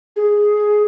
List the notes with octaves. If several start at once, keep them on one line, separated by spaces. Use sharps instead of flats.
G#4